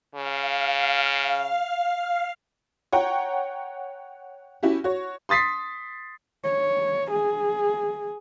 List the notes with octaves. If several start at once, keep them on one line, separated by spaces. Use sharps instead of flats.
C#3 F5
C#5 F#5 G5 A#5
C#4 E4 F#4 G4
F#4 C#5
C6 D#6 A6 B6 C7
C#5
G#4